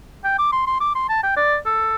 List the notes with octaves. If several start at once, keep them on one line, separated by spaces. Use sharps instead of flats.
G5
D6
C6
C6
D6
C6
A5
G5
D5
A4